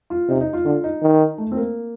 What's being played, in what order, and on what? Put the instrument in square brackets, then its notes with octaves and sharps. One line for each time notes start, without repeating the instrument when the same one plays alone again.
[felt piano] F4
[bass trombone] C3 [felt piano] D#4
[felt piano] D#4
F4
[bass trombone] D3 [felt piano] F4
[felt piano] D#4
[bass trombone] D#3
[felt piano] A3
C4
A#3